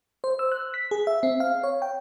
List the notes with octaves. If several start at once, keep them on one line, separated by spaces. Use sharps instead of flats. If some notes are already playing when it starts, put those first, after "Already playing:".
C5
E6
F#6
B6
G#4
E5
C4
F5
C#5
G5